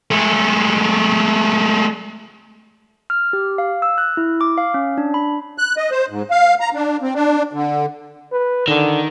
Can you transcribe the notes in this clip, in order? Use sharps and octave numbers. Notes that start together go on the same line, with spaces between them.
G#3 A3
F6
G4
F5
E6
F#6
E4
D6
F5
C#4
D4
B5
F#6
D#5
C5
G#2
F5
A#5
D4
C4
D4
D3
B4
D3 D#3